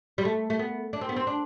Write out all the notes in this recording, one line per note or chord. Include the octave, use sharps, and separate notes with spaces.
G3
A3
A3
B3
D4
C4
B3
C4
D4